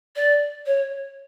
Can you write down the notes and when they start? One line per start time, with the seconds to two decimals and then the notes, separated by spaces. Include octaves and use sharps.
0.16 D5
0.66 C#5